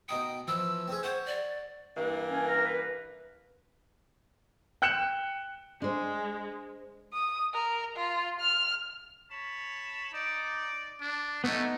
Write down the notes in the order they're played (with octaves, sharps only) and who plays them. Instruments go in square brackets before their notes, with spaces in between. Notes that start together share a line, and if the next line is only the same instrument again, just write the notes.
[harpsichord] B2 D#4 D#6 [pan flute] G5
[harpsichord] E3 F3 [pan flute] E6
[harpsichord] C4 C#4 G#4
[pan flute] C5 [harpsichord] C#5 F#5
[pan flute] D5
[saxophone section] G2 E3 A#3
[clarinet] C#4
A#4
B4
[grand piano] G5 F#6 C#7 E7
[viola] G#3 [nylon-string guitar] D4 C5
[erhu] D#6
A#4
F4
F6
[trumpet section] C#5 A5 B5
[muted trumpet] D#4 [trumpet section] D5
[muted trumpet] D4
[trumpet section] G3 C#4 [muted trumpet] A3 [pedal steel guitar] B3 D#4